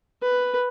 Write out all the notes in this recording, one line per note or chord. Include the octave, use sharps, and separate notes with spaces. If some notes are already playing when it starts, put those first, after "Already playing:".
B4